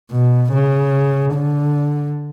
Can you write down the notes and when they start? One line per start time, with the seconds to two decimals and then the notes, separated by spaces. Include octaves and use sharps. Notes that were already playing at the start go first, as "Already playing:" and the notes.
0.11 B2
0.52 C#3
1.33 D3